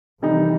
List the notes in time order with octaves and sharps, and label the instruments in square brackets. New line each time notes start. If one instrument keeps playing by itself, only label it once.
[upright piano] C3 D#3 G3 D#4 [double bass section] E3